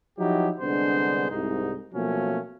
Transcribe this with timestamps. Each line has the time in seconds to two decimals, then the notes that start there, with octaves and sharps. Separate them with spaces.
0.19 F3 F#3 D#4 E4 G4
0.60 C2 D3 G#3 B3 D4 C5
1.31 C2 G#2 D#4
1.94 B2 F3 F#3 A3 A#3 C#4